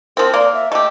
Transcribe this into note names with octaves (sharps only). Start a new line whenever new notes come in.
F3 C4 A#4
A#3 D5
E5
A3 G4 D#5